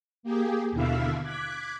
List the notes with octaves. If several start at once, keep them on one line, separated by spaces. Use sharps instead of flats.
A#3 G4 G#4
D#2 B2 D3 E4 E5 F5
D6 F#6 G#6 B6